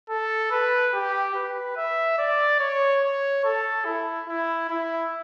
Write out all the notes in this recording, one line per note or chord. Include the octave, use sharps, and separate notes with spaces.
A4
B4
G4
B4
E5
D5
C#5
C#5
A4
E4
E4
E4